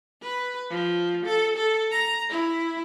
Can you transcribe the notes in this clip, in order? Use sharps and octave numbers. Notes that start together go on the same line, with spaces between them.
B4
F3
A4
A4
A#5
E4